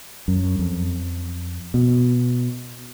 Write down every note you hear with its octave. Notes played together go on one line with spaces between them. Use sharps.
F#2
F2
B2